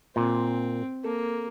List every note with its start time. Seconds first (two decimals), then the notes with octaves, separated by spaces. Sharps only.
0.16 A#2 C4
1.04 A#3 A4